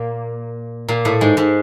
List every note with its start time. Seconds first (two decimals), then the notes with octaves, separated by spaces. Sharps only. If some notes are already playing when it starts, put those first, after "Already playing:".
Already playing: A#2 A#3
0.88 A#2 A#3
1.05 A2 A3
1.21 G#2 G#3
1.37 G#2 G#3